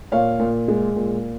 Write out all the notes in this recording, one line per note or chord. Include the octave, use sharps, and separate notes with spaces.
A#2 C#5 F5
A#2
G#3
A#2